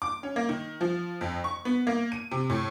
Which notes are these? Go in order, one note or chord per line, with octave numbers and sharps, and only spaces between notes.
D6
C#4
A#3
D#3
F3
F2
C#6
B3
A#3
D#7
C3
A2